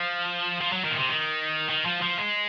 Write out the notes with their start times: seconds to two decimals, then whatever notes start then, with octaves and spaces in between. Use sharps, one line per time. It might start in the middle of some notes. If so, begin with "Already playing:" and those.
Already playing: F3
0.61 F3
0.72 F#3
0.84 D#3
0.91 A#2
0.97 C3
1.09 D#3
1.70 D#3
1.86 F3
2.03 F3
2.18 G#3